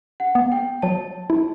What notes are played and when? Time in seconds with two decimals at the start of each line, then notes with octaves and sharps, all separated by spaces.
0.20 F#5
0.35 B3
0.52 G5
0.82 F#3 A5
1.30 E4